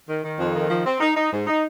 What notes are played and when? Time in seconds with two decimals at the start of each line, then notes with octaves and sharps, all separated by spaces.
0.08 D#3
0.24 D#3
0.39 F2
0.55 D#3
0.70 F3
0.86 C4
1.00 D#4
1.16 D#4
1.31 G#2
1.47 D#4